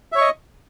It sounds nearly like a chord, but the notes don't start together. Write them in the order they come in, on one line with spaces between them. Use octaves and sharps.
E5 C#5 C#6 D#5